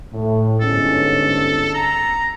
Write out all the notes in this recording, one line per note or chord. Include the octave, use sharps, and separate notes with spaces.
A2
G1 G#2 C#4 A4
A#5